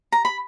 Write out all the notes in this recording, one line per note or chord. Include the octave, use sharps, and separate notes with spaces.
A#5
B5